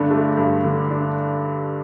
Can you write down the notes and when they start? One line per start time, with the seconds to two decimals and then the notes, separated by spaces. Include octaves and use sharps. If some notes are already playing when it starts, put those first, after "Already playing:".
Already playing: G2 D3 A3 D4
0.11 A3
0.37 G2
0.64 D3
0.91 D4